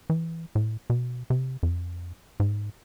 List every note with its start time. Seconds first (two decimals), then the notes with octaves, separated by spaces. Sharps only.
0.10 E3
0.55 A2
0.90 B2
1.30 C3
1.63 F2
2.40 G#2